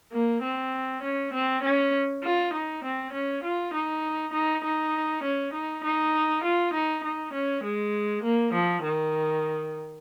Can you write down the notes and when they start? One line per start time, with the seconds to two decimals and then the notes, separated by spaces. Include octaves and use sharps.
0.13 A#3
0.43 C4
1.03 C#4
1.33 C4
1.63 C#4
2.24 F4
2.53 D#4
2.84 C4
3.13 C#4
3.44 F4
3.74 D#4
4.33 D#4
4.64 D#4
5.23 C#4
5.53 D#4
5.84 D#4
6.44 F4
6.73 D#4
7.04 D#4
7.33 C#4
7.64 G#3
8.23 A#3
8.53 F3
8.84 D#3